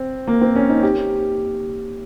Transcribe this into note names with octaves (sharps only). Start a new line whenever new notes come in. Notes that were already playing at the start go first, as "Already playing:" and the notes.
Already playing: C4
A#3
C4
C#4
D#4
G4